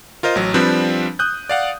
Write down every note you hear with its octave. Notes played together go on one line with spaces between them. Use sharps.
F4 A#4 C5 D#5
A1 F#3
F3 G3 C4 D4 B4
D#6 F#6 G6
D5 F5 F#5